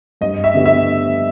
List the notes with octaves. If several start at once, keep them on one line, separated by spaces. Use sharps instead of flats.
G2 D#5
E5
D3 G3 B3
E5